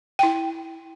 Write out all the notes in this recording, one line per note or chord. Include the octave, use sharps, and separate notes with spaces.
E4 G5